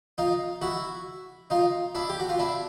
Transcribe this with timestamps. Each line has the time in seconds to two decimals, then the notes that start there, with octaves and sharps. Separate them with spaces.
0.18 D#4 F4
0.62 E4 F#4
1.50 D#4 F4
1.95 D4 E4
2.09 G4
2.20 F#4
2.29 F4
2.39 D4 E4